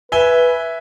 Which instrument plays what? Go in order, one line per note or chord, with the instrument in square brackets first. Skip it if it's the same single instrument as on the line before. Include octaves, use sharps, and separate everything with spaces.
[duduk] B4 [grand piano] E5 G#5 G7